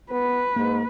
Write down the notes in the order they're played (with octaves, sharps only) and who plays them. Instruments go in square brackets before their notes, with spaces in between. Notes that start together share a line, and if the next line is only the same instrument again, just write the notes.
[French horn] B3 [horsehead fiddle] B4
[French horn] G#2 [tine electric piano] A#3